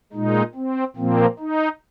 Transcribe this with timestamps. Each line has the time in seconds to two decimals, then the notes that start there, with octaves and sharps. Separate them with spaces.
0.13 A#2 G#3 D#4
0.55 C4
0.96 A#2 F3 A#3 C4
1.39 D#4